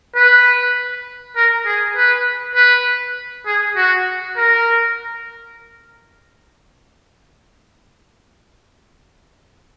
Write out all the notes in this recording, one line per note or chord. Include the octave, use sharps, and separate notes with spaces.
B4
A#4
G#4
B4
B4
G#4
F#4
A#4